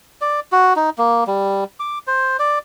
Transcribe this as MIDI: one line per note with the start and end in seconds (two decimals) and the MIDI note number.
0.21 0.40 74
0.52 0.74 66
0.76 0.90 63
0.98 1.24 58
1.27 1.64 55
1.80 1.98 86
2.07 2.37 72
2.39 2.59 74